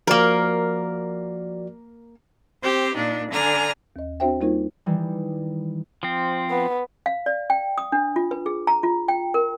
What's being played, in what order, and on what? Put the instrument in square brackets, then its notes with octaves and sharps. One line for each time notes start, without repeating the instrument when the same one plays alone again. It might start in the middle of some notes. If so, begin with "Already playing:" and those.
[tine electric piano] F3 F#4 D5 [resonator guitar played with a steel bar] A#3 A#4
[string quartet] C4 G4 C5
A#2 D4 D#4
D3 D4 G#5 A#5 F6
[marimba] D#2 D#5
C4 D4 F#4 C5 E5 G5
G3 A#3 D#4 F4 A#4 C5
[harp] D#3 E3 G3
[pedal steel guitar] F3 C4
[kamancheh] B3
[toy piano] F5
D5
G5
D#6
D4
F4
B4
G#4
A#5
F4
G5
A#4